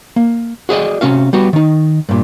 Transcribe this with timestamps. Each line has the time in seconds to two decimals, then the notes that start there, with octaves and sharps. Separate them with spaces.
0.16 A#3
0.69 F#4 G#4 D5 D#5
1.01 C3 C#4 F#4 F5
1.33 G3 B3 F#4
1.53 D#3 D#4
2.09 G2 A#2